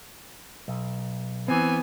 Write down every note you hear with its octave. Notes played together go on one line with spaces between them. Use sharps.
B1
E3 B3 C4 G#5